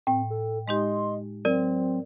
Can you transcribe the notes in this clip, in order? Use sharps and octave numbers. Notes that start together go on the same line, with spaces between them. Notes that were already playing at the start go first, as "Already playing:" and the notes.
A2 C4 G5
A4
G#3 D#4 G4 D#5 C6
F#3 C4 A#4 D5